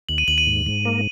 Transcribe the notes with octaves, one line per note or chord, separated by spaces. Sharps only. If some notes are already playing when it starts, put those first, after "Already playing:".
D#2 F#7
D#7
D#2 F#7
D#7
G#2
G#2
A#3